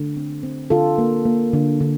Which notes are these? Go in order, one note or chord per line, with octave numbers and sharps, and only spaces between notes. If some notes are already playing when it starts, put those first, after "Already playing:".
Already playing: D3 A3
C4
C4
D3 F4 A4
A#3
A#3
D3
D3